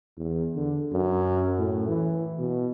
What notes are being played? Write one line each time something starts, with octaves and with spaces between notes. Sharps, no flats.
E2
D3
F#2
A2
E3
B2